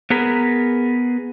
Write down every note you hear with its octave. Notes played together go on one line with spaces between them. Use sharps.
B3 G#4 A#4 B4